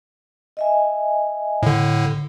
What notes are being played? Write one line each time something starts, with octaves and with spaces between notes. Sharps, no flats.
D#5 E5 G#5
A2 D3